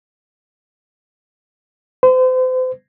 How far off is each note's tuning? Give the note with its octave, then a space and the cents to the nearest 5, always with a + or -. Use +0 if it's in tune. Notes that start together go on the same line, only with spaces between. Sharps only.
C5 -35